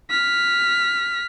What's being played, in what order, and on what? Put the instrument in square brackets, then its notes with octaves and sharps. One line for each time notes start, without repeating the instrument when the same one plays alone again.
[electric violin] F6 B6